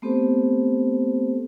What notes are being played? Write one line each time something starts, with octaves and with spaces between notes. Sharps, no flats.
A3 B3 C4 G4 A4 C5